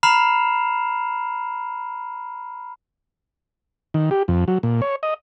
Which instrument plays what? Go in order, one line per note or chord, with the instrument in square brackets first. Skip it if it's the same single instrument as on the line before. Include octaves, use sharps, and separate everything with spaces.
[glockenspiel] A#5 B5 F6 C7 E7 F7
[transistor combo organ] D#3
G4
F2
F#3
A#2
C#5
D#5